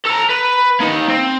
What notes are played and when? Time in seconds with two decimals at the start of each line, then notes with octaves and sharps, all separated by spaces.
0.05 A4 A#5
0.29 B4
0.80 A#3 D#4
1.09 C4